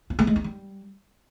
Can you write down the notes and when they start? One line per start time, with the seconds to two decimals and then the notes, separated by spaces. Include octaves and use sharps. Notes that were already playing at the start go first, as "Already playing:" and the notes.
0.10 F4
0.19 A3
0.27 G#3
0.36 D#4
0.44 G3